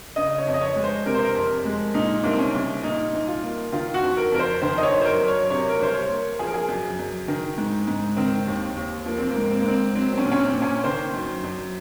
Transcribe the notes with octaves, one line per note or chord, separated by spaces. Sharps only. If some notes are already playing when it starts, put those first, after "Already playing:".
C#3 D#5
C#5
F2
D#5
C#5
G#3
C5
C3 A#4
C5
A#4
F2
G#3
A#2 D#4
C2 A#3
C4
C#4
C2
A#2 D#4
C2
F4
A#3
D#3 F4
F#4
F2
A#4
F2 A#4
C5
D#3 C5
D#5
C#5
F#2
C5
A#4
F#2
C#5
C3 C#5
A#4
C2 C5
C#5
A#3
F3 G#4
A#4
G#4
F#2
F#2
D#3
G#2
G#2
D#3 C4
D#2
D#2
F3 A#3
C4
A#3
G#2
C4
A#3
G#2 C4
F#3 C4
C4
C#4
A#2
C#4
C4
A#2
C#4
D#3 C5
F#2
F#2